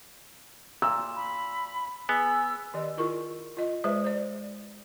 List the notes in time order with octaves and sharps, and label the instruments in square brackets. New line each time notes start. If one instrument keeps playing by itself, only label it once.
[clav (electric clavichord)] A#2 [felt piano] E6
[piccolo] B5
[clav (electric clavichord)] B3 [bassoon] G#4 [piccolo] E6
[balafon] D#3 G4 D5 D#5
E4 F4 G#4 A#4 C#6
F4 D#5
G#3 G#4 B4 C5 E5
C5 D5